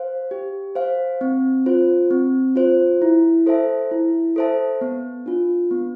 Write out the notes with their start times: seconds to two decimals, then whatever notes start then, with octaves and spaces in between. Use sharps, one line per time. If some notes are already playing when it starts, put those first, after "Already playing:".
Already playing: C5 F5
0.31 G4
0.75 C5 F5
1.21 C4
1.66 F4 C5
2.11 C4
2.56 F4 C5
3.02 E4
3.46 A4 C5 E5 A5
3.91 E4
4.36 A4 C5 E5 A5
4.81 B3
5.26 D4 F4
5.71 B3